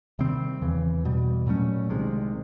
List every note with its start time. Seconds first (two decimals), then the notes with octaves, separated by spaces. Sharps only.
0.19 C3 D#3 G3 C4
0.62 E2 C#3 E3
1.04 E2 B2 G3
1.46 A#2 F#3 A3 C#4
1.89 C2 C3 D#3 G#3